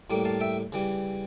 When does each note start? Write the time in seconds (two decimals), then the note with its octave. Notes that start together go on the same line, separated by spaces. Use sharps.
0.10 A2 G3 A#3
0.25 F5 A5
0.41 E5 G5
0.72 C#3 E3 G3